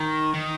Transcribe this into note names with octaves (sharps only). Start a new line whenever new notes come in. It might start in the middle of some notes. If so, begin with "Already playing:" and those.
Already playing: D#3
D#3